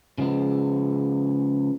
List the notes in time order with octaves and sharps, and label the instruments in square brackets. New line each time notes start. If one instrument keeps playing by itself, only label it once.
[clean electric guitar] C#3 F3 G#3 B3